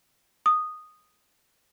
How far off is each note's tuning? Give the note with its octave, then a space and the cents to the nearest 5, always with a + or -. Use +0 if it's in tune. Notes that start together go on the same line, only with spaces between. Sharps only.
D#6 -10